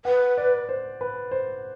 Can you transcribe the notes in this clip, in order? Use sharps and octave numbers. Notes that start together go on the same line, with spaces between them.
B4 F#5
D5
C5
B4
C5